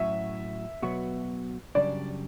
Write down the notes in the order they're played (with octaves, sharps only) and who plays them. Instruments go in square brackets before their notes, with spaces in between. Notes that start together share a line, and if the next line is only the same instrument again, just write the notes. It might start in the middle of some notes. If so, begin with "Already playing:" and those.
Already playing: [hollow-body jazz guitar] A2 F#3 C#4 F#4 [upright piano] E5
[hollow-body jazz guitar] B2 F#3 B3 F#4
[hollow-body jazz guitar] F#2 C#3 G3 D4 [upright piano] D5